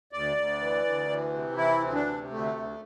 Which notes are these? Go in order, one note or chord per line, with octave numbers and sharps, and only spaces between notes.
D2 D5
D2
E3
D2
E3
C3
E3 E4
D2 C4
D4
C3
D2 A3
D2